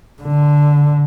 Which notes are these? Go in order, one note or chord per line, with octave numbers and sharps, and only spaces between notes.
D3